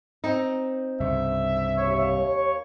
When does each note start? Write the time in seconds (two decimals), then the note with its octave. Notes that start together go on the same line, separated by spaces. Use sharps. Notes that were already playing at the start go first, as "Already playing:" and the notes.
0.24 C4 D#4
1.00 C2 G2 C#3 E5
1.78 D#2 C#5 C#6